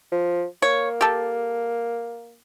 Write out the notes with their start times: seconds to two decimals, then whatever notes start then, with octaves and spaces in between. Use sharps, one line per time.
0.12 F3
0.62 A#3 C#5
1.01 G4 A4